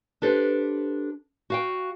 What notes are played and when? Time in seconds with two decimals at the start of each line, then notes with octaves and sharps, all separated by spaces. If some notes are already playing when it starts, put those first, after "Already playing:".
0.22 D4 G4 A4 B4 C5
1.50 F#4 F5 G5